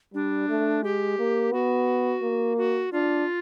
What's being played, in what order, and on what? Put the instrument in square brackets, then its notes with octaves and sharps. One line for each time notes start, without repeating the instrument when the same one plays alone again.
[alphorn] G3 [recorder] D4
[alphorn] A3
[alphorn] G#3 [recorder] G4
[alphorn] A#3
[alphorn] B3 [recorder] F#4
[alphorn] A#3
[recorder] F#4
[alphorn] D4 [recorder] F4